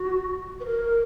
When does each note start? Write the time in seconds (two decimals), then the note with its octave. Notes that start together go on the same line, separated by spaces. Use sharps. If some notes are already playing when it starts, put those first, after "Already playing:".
Already playing: F#4
0.60 B4
0.66 A#4